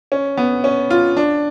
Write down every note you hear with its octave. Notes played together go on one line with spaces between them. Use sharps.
C#4
B3
C#4
F4
D4